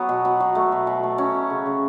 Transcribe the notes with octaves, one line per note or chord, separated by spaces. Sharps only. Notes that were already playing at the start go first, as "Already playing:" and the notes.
Already playing: F#3 B3
B2
B2
F#3
A3
B2
B2
A3
F#3 C#4
F#3
C#3
C#3